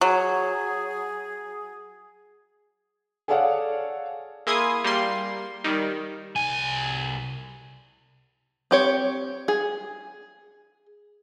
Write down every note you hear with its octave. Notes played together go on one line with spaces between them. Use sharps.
F#3 G#4
G#4 A4 C#5 D5 F5 F#5
A#3 E4 G#4 C6 D#6 G#6
G3 A#3 C6
D#3 G3
C2 G#5
C4 G4 C#5
G#4